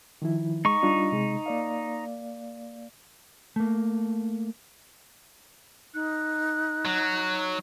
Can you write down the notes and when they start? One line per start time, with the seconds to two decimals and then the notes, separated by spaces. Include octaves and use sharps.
0.22 D#3 F3 E4
0.65 G#3 D#4 C#6
0.83 G3 D4 F4
1.12 C3 G#3
1.46 A#3 D5 F5
3.56 A3 A#3
5.94 D#4 F#6
6.85 F#3